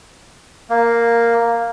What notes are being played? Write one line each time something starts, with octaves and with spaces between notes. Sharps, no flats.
A#3